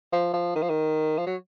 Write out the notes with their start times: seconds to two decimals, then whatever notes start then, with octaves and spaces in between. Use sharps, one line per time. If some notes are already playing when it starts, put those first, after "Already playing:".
0.13 F3
0.33 F3
0.55 D#3
0.62 F3
0.69 D#3
1.18 F3
1.27 F#3